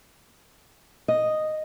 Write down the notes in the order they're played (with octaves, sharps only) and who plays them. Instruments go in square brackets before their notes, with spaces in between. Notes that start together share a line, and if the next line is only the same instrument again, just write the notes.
[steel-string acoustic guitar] D#5